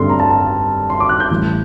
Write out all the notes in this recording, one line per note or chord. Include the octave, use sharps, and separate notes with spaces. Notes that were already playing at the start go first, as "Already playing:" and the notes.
Already playing: G2 D3 A3 C4 C6
A#5
A5
A5
C6
D6
F#6
G6
A1 A2 G3